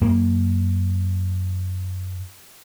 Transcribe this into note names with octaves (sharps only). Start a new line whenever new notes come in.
F#2 A#3